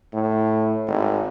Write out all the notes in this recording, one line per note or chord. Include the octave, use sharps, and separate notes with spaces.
A2
G#1